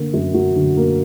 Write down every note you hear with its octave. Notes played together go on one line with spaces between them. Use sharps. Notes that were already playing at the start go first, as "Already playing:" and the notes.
Already playing: D3 A#3
F#2
F#3
D3
A#3